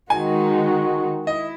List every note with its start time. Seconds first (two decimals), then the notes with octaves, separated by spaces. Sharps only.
0.10 D#3 G#3 D#4 F#4 G#5
1.27 E4 D#5